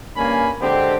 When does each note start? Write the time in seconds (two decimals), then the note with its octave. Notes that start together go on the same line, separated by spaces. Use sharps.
0.16 G2 A#3 C#4 G#5 B5
0.62 D3 G#3 C4 G4